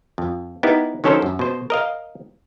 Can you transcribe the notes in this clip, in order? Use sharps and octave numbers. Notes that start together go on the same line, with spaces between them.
F2
B3 D#4 E4 G4 A#4
D#3 F#3 C#4 A4 A#4 C5
F#2
B2 C5
A#4 D#5 F5